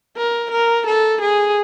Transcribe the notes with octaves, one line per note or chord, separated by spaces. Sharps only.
A#4
A#4
A4
G#4